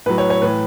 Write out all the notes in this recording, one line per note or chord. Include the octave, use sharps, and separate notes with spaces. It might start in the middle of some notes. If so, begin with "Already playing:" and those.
A2 F#3 B4
C#5
C#5
A2 E3 B4